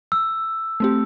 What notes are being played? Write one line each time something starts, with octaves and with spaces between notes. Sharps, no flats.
E6
A3 C4 G4